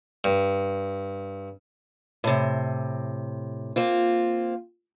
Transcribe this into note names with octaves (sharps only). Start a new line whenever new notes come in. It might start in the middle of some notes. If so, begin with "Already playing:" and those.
G2
A2 C3
A#3 C4 F4